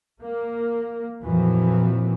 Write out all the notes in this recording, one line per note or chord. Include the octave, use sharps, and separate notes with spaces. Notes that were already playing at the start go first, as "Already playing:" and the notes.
A#3
F2 A#2 E3 F#3